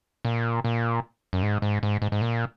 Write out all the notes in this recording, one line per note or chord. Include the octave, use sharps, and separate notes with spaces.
A#2
A#2
F#2
G#2
G#2
G#2
G#2
G#2
A#2